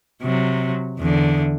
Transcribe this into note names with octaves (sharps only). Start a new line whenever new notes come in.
C3 F#3
E2 D3